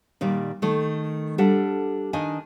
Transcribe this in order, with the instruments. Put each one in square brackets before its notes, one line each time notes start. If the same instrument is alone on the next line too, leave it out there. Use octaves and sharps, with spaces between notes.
[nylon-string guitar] A#2 D#3 G3 D5
D#3 A3
G3 D4 A4 F#5
D#3 D4 D#4 D#5 G#5